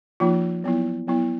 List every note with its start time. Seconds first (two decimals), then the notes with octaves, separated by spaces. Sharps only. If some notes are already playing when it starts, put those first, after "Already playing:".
0.20 F3 A#3 D#4 F4
0.64 F#3 B3 E4
1.07 F#3 B3 E4